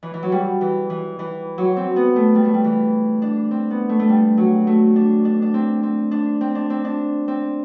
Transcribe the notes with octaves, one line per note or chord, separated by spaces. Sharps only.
E3
E3
F#3
G3
E3
E3
E3
F#3
C4
B3
A3
G3
A3
G3
E3
D4
C4
B3
A3
A3
G3
F#3
A3
D4
D4
D4
C4
C4
D4
C4
D4
C4
D4
C4